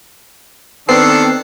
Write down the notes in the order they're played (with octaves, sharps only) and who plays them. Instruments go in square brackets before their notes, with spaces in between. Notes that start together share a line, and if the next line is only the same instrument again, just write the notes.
[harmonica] D#3 D4 A4 [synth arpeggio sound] B3 C4 C7